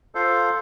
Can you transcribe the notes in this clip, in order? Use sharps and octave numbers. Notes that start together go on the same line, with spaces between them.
F4 A4 C5 F5